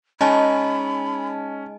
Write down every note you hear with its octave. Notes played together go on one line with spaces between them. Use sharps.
G#3 C#4 D#4 D#5 G#5 A5 B5